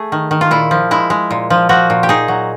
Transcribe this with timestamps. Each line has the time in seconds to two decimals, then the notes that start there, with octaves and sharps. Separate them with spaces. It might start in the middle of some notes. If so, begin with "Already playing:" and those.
Already playing: A3 G#4
0.12 D#3
0.31 D#3
0.41 F4
0.51 A#2 E4
0.71 F3
0.91 G#3 E4
1.10 G#3
1.31 A#2
1.50 F3
1.69 F3 F#4
1.90 A#2
2.03 G4
2.09 D#4 G#4
2.28 F#3